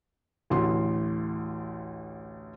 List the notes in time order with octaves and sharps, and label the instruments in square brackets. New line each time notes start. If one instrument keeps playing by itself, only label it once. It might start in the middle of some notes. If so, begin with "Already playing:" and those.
[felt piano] A1 D2 E3 C6